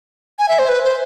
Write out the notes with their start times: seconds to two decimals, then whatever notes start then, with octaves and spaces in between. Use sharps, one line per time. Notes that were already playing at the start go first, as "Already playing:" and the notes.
0.39 G#5
0.49 E5
0.59 C5
0.69 B4
0.84 C5